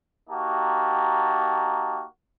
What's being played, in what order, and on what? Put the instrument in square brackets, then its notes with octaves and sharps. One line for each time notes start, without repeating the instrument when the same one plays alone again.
[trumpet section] A#3 D#4 F#4 G4 A5